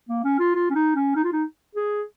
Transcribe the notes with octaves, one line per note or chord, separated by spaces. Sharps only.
A#3
C#4
F4
F4
C#4
D#4
C#4
D#4
F4
D#4
G#4